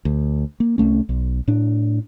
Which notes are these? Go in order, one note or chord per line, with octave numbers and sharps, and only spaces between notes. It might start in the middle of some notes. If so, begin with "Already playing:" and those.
D2
A#3
C2 F#2 A3 C#4
B1
A2 D4